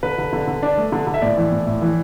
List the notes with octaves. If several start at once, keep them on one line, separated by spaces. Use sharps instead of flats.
D3 B4
D3
D3
D3
D4
A3
D3
D3
E5
A2 D5
E3
A2
A2
E3